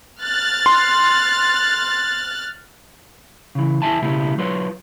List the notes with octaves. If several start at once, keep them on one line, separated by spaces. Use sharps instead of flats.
F6 F#6 A6
C6
C#3 E3
E2 D#3 E4 E5 G#5 A5
B1 C#3 A3 E4 G4
F#3 F4 B4 C#5